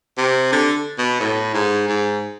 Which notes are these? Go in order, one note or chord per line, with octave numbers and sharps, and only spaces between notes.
C3
D3
B2
A2
G#2
G#2